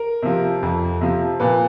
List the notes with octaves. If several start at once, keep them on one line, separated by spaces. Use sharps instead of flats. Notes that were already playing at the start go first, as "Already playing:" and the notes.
Already playing: A#4
C3 F3
F2
C3 F3
A#2 B4